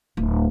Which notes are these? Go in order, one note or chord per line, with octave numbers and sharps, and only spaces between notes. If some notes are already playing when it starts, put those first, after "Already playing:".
D1